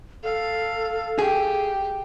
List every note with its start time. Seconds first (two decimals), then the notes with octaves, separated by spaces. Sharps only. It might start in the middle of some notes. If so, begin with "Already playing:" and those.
0.23 A4 F5
1.19 G4 G#4